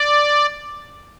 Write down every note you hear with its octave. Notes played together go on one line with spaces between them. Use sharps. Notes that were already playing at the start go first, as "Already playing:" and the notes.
Already playing: D5